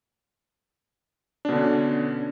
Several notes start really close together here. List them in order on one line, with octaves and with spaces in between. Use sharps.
D4 B2 D3 C#4